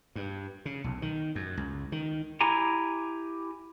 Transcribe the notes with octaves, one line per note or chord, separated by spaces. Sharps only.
G2
C#3
B1
D#3
F#2
C#2
D#3
E4 G4 G#5 A#5